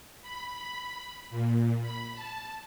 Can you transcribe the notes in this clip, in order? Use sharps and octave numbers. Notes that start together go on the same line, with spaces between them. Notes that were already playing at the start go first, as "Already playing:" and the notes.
B5
A#2
B5
A5